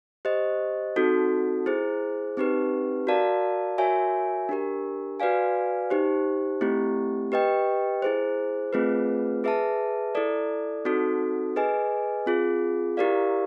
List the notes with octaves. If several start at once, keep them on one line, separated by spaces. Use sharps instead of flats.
G4 C5 D#5
C4 D#4 F#4 A4
E4 G#4 C5
C4 D#4 G4 B4
F#4 A#4 D5 F5 A5
F#4 A#4 C#5 E5 G#5
D4 G4 A#4
F#4 B4 D5 F5 G#5
D#4 G4 C5
A3 C4 E4 G4
G4 B4 D#5 G5
E4 G#4 C5
A3 C4 F4 G#4 B4
G#4 B4 E5 A5
E4 A4 D5
C4 D#4 F#4 A4
G#4 B4 D#5 G#5
C4 F4 G#4
E4 G4 A#4 D5 F5